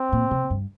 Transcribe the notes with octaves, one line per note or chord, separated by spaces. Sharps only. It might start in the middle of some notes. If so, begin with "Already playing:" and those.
Already playing: C4
A#2
C3
G2